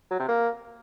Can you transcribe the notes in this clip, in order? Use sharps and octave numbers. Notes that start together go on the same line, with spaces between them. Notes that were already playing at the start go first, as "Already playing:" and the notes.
F#3
C3
A#3